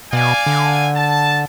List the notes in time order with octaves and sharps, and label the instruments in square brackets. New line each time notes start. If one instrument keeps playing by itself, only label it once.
[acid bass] B2 [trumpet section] D5 F5 G#5
[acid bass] D3
[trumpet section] A5